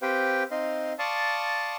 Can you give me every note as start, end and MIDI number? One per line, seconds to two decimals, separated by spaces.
0.02 0.43 60
0.02 0.43 67
0.02 0.43 71
0.02 0.43 72
0.02 0.43 77
0.02 0.43 79
0.51 0.93 60
0.51 0.93 63
0.51 0.93 75
0.51 0.93 77
0.51 0.93 84
0.99 1.77 74
0.99 1.77 77
0.99 1.77 81
0.99 1.77 84
0.99 1.77 85
0.99 1.77 87